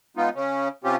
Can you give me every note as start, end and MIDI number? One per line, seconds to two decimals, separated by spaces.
0.17 0.29 56
0.17 0.29 59
0.17 0.29 63
0.17 0.29 65
0.35 0.68 49
0.35 0.68 61
0.84 0.96 48
0.84 0.96 60
0.84 0.96 61
0.84 0.96 65
0.84 0.96 67